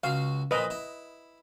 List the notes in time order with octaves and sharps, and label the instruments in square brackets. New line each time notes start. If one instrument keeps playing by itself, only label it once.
[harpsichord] C#2 F#4 [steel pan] F5
[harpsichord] A#2 F3 [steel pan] B4 D#5
[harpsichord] E4